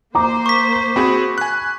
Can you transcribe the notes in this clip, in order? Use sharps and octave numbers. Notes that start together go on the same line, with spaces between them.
A#3 C5 A#5 D6
C#6 B6
C4 F#4 G#4 B5
G#5 F#6